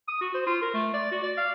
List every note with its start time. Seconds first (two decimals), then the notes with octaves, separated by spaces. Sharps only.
0.08 D#6
0.21 F#4
0.34 C5
0.46 F4
0.62 A#4
0.74 A3
0.94 D5
1.11 F#4
1.23 D5
1.37 F5